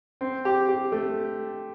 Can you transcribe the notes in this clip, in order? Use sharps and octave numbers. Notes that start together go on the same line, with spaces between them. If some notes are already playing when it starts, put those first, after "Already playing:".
C4
G4
G4
A3